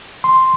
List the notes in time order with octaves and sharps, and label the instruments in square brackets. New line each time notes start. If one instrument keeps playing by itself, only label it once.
[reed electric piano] C6